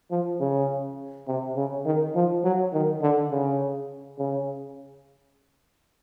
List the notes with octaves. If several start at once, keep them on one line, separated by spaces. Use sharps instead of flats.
F3
C#3
C3
C#3
D#3
F3
F#3
D#3
D3
C#3
C#3